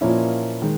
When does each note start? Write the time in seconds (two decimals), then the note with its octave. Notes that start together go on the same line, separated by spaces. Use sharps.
0.01 A#2 F3 A#3 C#4 E4
0.62 D#3 G#3